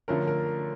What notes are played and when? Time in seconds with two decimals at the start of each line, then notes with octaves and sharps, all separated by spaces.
0.08 D3 F3 A3 C#4 A#4
0.27 A#4